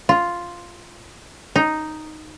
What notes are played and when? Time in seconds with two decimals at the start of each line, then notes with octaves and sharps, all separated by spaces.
0.09 F4
1.56 D#4